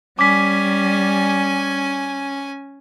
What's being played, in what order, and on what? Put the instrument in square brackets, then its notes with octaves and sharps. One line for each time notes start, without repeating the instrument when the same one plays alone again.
[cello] G3 [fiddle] C#4 G#5 [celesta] D6 B6